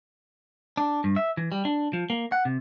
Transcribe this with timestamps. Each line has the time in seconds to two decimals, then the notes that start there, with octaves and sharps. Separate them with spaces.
0.77 D4
1.04 G2
1.16 E5
1.37 E3
1.52 G3
1.65 D4
1.93 F3
2.10 A#3
2.32 F#5
2.45 C3